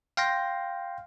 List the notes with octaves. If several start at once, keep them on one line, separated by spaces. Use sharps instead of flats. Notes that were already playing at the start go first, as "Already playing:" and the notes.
F5 G5 C6 A#6